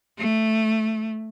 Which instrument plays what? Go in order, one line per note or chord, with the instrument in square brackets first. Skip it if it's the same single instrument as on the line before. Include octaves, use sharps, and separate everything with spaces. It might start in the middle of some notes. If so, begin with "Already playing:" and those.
[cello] A3